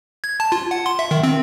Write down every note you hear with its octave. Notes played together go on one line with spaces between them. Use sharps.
G#6
A5
F4
F#5
C6
E5
D#3
C4